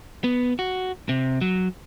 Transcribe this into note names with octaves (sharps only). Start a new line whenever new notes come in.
B3
F#4
C3
F#3